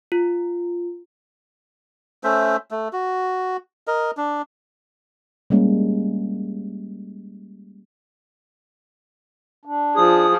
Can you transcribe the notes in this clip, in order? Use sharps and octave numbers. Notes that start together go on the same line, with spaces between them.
F4
A3 C#4 C5 E5
A3
F#4
A#4 D#5
D4
G3 G#3 A#3 C#4
D4
F3 G#4 D#6